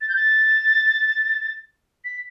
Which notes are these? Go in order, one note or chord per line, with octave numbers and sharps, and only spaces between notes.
A6
G6
A6
B6